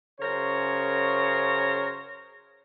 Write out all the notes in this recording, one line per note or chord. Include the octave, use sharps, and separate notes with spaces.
F#2 C#3 A#4 C5 C#5